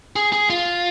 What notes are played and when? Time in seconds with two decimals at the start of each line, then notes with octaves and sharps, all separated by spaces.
0.16 G#4
0.32 G#4
0.50 F4